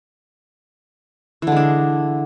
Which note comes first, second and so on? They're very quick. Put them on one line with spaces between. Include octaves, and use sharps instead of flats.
E3 D3 G#3 D4